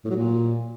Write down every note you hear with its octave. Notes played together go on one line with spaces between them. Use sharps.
A2
F#3
A#2